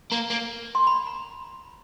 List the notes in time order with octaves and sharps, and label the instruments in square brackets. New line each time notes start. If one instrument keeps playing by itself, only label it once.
[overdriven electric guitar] A#3 [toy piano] A#5
[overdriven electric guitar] A#3
[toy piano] C6
B5
A#5